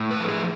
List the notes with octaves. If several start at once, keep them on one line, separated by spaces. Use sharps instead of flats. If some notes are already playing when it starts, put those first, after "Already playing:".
Already playing: A2
B4
F3 A4
G#4